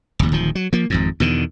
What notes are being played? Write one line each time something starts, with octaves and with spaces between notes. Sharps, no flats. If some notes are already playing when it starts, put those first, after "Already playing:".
F1 D#2
D1 D#3 F3
F#3
F3 A#3
G#1 F2 G#2
E2 B2 D3 D#3